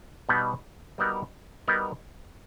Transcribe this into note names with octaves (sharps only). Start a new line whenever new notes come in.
B2 G3 B3 D#4
G3 B3 D#4 F#4 A#4
G3 B3 D#4 F#4 A#4